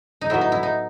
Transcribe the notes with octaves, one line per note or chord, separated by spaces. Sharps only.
D#4
A2 F#3 B3 E4
D#4
E4
D#4